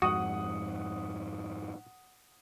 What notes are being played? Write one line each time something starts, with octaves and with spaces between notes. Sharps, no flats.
F2 G#2 F#4 F#5 D#6